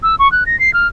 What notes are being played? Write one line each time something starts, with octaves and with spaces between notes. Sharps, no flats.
E6
C#6
F#6
A#6
C7
F6